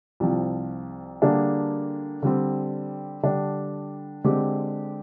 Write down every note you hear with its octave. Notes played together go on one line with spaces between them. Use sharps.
C2 C3 F3
D3 G3 A#3 D4 G#4
D3 G3 C4
D3 G3 D4
D3 G#3 C4 G4